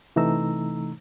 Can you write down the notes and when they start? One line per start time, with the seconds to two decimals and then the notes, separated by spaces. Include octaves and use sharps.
0.16 C3 E3 A3 D#4 A#5 E6